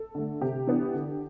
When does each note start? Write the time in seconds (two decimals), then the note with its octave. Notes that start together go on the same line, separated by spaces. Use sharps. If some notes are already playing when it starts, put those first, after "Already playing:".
Already playing: A4
0.15 D3 A3
0.41 C3 G4
0.67 E3 B3 D4
0.94 D3